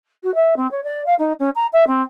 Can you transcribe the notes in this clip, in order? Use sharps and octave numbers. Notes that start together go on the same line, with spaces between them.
F#4
E5
C4
C#5
D5
F5
D#4
C#4
A#5
E5
C4